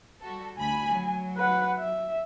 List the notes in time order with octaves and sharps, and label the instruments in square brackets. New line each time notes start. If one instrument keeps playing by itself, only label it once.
[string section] G3 F#4 A4
[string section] D2 B5 [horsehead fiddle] G#5
[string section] F#3
[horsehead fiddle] B4 F#5
E5